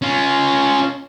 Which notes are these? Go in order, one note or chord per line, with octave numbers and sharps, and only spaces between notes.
C#4 F4